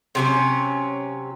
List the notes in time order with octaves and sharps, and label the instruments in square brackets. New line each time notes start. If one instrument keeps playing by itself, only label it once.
[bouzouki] C3 F#3 C#4